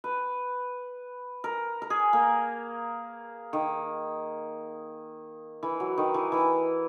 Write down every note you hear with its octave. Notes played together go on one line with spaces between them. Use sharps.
B4
A#4
A#4
G#4
A#3
D#3
E3
F#3
D#3
E3
E3